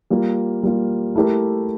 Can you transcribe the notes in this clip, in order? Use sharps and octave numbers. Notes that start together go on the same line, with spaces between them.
G3 A#3 F4
G3 A#3 F4
A3 E4 G4 A#4